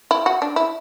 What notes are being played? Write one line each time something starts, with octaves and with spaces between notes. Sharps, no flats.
E4
F#4
D4
E4